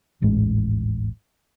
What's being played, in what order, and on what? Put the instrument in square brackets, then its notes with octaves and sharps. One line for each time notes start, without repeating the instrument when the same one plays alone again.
[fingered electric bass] D#1 A1 G#2 G#3